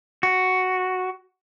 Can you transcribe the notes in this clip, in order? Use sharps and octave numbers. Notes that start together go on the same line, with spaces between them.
F#4